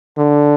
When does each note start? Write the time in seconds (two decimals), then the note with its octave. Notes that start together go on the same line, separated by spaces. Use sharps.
0.18 D3